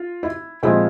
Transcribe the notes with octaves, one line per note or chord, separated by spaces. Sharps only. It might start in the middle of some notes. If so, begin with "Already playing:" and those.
Already playing: F4
E4
A#2 F3 G#3 C4 E4